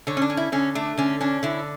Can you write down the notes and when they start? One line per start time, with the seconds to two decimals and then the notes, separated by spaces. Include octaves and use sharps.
0.07 D3 C#5
0.17 C#4
0.22 D4
0.30 C#4
0.37 E4
0.52 D3 C#4
0.75 A3 D4
0.97 D3 C#4
1.21 C#4 D4
1.43 D3 E4